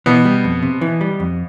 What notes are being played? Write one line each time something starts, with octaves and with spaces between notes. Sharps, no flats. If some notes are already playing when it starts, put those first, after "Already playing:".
B2 E3 B3
G3
F2
C3
E3
G3
F2